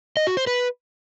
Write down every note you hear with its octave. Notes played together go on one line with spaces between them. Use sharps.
D#5
F#4
C5
B4